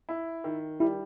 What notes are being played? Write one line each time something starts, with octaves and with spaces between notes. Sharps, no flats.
E4
D#3
G3 E4